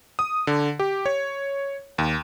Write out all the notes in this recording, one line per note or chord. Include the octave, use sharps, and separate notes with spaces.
D#6
D3
G4
C#5
D#2